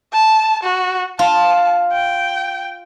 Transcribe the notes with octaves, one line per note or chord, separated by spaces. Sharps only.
A5
F#4
F4 A5
G5